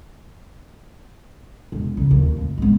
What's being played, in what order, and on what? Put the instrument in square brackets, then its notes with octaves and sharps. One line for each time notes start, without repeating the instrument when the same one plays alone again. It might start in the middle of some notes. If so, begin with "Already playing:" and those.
[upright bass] E1
C#3
D#2
F1
G#3 B3